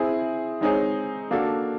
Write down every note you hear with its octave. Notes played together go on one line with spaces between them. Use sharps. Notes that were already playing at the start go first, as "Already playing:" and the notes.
Already playing: C4 E4 G#4
G#3 C4 D#4 G#4 C#5
A#3 D4 F#4 A4